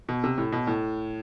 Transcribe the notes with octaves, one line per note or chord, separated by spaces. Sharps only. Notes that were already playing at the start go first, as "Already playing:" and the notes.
B2
C3
A2
B2
A2